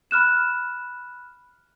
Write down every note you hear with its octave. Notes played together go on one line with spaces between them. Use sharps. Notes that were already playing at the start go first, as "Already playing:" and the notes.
B5 F6 F#6 E7